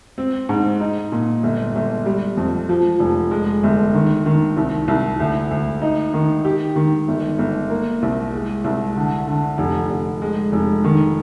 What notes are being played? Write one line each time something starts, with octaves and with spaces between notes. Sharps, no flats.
C4
G#2
D#4
A#2
G1
G1
G3
F2
F3
F1
G#3
G1
D#3
D#3
C2
C2
D2
D2
D#4
D#3
G4
D#3
G1
G1
A#3
C2
G#3
C2
D3
D3
F1
F1
G#3
F1
D#3